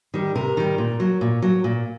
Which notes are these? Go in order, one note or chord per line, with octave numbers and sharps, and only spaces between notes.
D#3 G3
C3 A#4
D#3 G3
A#2
F#3
A#2
F#3
A#2